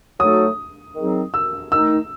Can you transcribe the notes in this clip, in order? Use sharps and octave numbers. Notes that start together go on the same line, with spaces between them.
F#3 A3 D#4 F#4 A4 D#6
D#3 F#3 C4 D#4 G#4
E6
D#3 A3 D#4 E6